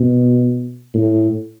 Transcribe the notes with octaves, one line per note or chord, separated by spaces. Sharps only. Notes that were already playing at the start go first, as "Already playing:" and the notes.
Already playing: B2
A2